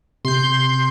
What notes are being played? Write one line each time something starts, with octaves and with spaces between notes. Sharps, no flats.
C3 C6 G6